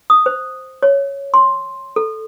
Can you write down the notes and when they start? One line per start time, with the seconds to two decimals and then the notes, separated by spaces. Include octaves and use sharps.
0.10 D#6
0.26 C5
0.83 C#5
1.34 C6
1.96 A4